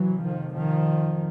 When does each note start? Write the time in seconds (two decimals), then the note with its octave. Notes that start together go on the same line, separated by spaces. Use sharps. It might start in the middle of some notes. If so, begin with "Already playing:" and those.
Already playing: F1 F2 C3 E3 F#3
0.23 D#3 F3
0.55 D#3 F3